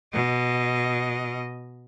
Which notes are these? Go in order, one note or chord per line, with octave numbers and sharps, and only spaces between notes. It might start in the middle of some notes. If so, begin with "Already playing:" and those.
B2 D#5